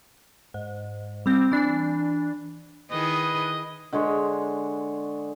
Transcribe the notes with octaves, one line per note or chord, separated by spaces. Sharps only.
G#2
G3 C4
E3 D4
D#3 E4 G#4 B4 D#5
D3 G#3 C#5 C6